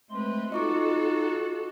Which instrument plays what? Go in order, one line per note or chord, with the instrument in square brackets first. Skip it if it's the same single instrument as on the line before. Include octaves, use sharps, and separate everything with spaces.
[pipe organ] G#3 A3 C6 [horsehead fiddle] C4 B4
[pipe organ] D#4 [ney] F4 [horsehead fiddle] F#4 A4 [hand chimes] D#5 C#6 D6